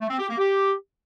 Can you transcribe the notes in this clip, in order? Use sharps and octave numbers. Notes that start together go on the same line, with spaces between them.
A3
C4
G4
A#3
G4